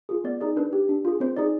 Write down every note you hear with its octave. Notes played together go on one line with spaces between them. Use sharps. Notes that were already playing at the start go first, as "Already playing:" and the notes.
F4 G#4
B3 D5
D#4 G#4 D5
D4 B4
G4
D4
F4 G#4
C4 C5
D#4 G#4 D5